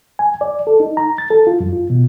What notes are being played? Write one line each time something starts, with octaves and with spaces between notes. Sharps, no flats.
G#5
D5
A4
D#4
A#5
A6
A4
F4
F#2
F4
B2